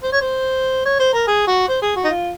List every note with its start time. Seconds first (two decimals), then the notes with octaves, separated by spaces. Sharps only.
0.03 C5
0.12 C#5
0.21 C5
0.85 C#5
0.99 C5
1.13 A#4
1.27 G#4
1.47 F#4
1.68 C5
1.82 G#4
1.95 F#4
2.04 D#4
2.09 F4